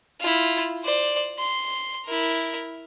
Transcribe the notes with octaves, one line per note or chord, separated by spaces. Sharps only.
E4 F4
C5 D5
C6
E4 A#4